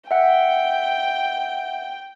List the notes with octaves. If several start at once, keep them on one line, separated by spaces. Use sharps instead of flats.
E5 F#5 G5